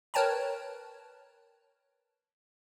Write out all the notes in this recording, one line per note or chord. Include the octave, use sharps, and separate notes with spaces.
A#4 B4 C#5 G5 A5 A#5